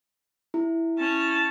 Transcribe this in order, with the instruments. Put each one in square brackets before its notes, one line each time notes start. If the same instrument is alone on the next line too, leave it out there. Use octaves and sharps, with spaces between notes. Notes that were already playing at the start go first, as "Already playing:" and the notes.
[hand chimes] E4
[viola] C#4 A5